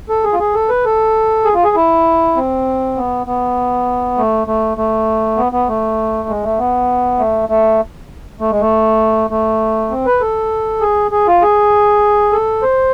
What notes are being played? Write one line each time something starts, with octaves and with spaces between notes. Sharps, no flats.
A4
G#4
F4
G#4
A4
B4
A4
G#4
F4
G#4
E4
C4
B3
B3
A3
A3
A3
B3
B3
A3
G#3
A3
B3
A3
A3
A3
G#3
A3
A3
C4
B4
A4
G#4
G#4
F4
G#4
A4
C5